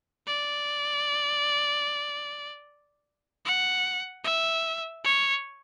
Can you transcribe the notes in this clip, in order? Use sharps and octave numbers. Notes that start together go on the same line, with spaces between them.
D5
F#5
E5
C#5